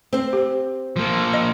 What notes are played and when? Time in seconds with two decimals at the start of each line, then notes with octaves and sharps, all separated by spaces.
0.13 C4 C5
0.33 G4
0.96 F3 A#3
1.34 D#5